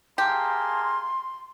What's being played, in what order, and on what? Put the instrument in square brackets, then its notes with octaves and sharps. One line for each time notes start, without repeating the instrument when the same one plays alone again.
[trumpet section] A#3 G#4 A5 [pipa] G4 [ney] C6